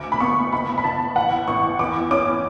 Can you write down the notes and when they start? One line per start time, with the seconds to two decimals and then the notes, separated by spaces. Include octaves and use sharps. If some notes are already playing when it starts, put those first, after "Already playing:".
Already playing: D2 D6
0.12 B5
0.20 B3 C#6
0.53 F#1 B5
0.78 B5
0.84 F#1 A5
1.16 A1 F#5
1.47 A1 C#6
1.79 E2 D6
2.11 C#4 D6